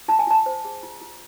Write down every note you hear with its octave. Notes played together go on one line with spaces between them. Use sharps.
F4 A5
G#5
F4 A5
C5
G#4
F4
F4